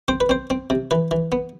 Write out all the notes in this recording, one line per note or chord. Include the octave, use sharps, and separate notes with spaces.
C4 C5
B4
C4 C5
C4
C3
E3 B4
E3
B3